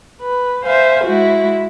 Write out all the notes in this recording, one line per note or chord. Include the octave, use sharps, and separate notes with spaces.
B4
C5 E5 F5 G#5
G#3 E4 F#4